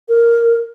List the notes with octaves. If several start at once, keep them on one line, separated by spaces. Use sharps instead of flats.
A#4